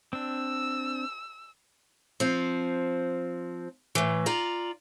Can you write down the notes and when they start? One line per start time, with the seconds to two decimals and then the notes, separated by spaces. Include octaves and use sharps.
0.13 C4 D4 E6
2.20 F3 C4
3.95 A2 E3
4.26 F4 D5 A#5